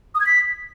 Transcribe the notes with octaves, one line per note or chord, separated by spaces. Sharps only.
D#6
G#6
B6